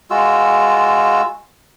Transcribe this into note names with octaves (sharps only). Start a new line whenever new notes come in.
G#3 F4 F#4 E6